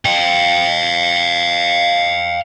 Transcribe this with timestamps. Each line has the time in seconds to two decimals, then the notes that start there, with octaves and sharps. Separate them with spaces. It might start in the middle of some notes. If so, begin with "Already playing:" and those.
0.05 F5 G5